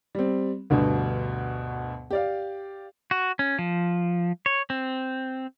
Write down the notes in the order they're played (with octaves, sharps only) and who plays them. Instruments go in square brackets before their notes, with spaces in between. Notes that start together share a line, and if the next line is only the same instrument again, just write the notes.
[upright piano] G3 C4
D2 G2 B2
G4 D5 F5
[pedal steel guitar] F#4
C#4
F3
C#5
C4